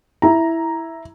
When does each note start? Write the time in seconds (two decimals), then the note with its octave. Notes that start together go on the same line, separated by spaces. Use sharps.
0.22 E4 A#5